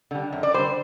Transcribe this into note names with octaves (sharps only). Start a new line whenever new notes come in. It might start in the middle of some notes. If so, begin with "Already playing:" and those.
D3 G3
F#2
D5
D3 G3 C5